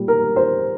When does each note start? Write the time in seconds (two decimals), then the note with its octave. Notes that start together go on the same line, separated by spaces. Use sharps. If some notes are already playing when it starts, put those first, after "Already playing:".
Already playing: A#2 G3
0.08 A#4
0.36 C5